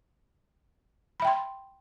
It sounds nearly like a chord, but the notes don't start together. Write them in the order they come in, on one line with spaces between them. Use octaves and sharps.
B5 E5 G5 C6